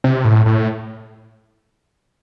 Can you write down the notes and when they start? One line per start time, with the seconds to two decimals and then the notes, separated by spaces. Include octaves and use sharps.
0.04 C3
0.25 A2
0.46 A2